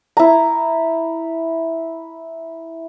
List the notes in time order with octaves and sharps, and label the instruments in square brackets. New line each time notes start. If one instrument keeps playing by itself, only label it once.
[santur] E4 A#5